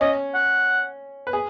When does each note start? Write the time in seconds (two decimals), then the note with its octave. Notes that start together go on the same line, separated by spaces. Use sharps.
0.01 C#4 D#5
0.34 F#5
1.27 B4
1.33 G#4